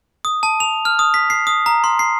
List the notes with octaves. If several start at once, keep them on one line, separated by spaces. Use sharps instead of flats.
D#6
A5
F7
F6
D#6
B6
C7
D#6
A#5
C6
C7